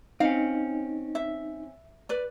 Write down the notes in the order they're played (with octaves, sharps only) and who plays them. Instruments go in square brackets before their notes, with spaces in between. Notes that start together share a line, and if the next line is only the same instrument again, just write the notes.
[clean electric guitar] C4 C#4 [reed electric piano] D#4 [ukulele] F5
[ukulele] E5
B4 D5